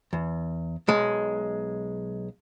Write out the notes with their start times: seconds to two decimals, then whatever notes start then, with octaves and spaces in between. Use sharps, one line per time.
0.13 E2
0.88 B1 G#3